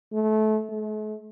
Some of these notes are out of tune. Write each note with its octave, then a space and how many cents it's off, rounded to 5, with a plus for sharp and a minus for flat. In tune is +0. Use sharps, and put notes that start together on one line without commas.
A3 -25
A3 -45